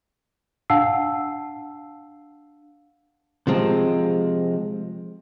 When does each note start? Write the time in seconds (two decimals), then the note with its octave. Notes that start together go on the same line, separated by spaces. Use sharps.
0.70 D4 F5 F#5 A5 E6 C7
3.47 C3 F3 G#3 C4